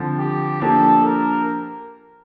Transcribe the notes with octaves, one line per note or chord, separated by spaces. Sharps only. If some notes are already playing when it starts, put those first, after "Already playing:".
Already playing: D3 F3 C4
G4
F3 A#3 D4 G4 A4
A#4